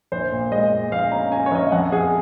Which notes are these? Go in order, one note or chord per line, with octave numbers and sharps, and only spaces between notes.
A#1 C5
A#2
G#3 D#5
A#2
A#1 F5
C#4 A#5
C#4 G#5
C#5
A#1 D#5
F5
F2 F#5
F2 G#4